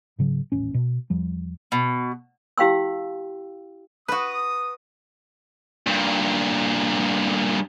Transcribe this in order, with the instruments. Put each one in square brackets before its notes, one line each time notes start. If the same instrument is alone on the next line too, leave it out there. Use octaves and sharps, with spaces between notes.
[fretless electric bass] G#2 C#3 F#3
D#1 A1 C#4
B2
E2 F3 G3
[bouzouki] B2
[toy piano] E4 G4 F5 G5 C6 E6
[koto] F#4 B4 [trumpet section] D#6
[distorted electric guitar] G2 A#2